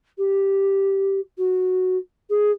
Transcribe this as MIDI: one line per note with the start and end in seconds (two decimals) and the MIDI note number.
0.18 1.20 67
1.38 1.97 66
2.30 2.51 68